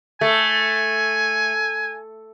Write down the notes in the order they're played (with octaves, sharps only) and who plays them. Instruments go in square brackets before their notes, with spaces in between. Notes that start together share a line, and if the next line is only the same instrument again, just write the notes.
[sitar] A3 [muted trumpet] G#5